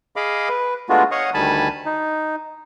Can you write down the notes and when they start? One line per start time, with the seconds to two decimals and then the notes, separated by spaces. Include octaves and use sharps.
0.16 G#4 D#5 F5 B5 D6
0.49 B4
0.89 G#3 A3 B3 D4 F4 F#4
1.11 C#5 D#5 F5 F#5 C#6 D#6
1.34 D2 D#3 G3 G#5 A5 B5
1.85 D#4